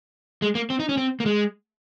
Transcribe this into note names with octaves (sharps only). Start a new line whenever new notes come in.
G#3
A#3
C4
D#4
C#4
C4
A#3
G#3